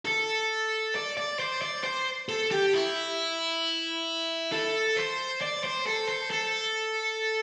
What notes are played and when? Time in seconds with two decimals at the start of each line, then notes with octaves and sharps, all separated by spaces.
0.05 A4
0.95 D5
1.17 D5
1.39 C5
1.62 D5
1.84 C5
2.29 A4
2.51 G4
2.73 E4
4.52 A4
4.97 C5
5.42 D5
5.64 C5
5.87 A4
6.09 C5
6.30 A4